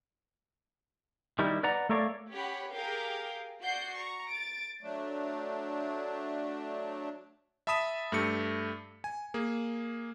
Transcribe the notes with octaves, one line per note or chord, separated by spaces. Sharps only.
D#3 G3 D#4 E4
B4 D5 F#5 A#5
A3 A4 A#4 C#5 D5 F5
C#4 G4 C#5 F#5 B5
G4 G#4 A#4 F5 G5 G6
F#4 D5 F#5 G6 C7
A#5 C#6
A6 D7
F#3 A3 D4
E5 A5 B5 D#6 B6 E7
G2 A3 G4 C#7
G#5
A#3 G#4